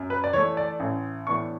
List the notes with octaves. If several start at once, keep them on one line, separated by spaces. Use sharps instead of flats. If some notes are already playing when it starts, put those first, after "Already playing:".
Already playing: F#2
B4
D5
E3 A3 C#5
D5
A1
A2 E3 B3 D4 C#6